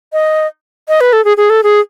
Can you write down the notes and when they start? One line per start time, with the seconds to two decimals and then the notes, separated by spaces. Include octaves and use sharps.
0.13 D#5
0.88 D#5
1.01 B4
1.13 A4
1.25 G#4
1.37 G#4
1.50 A4
1.63 G#4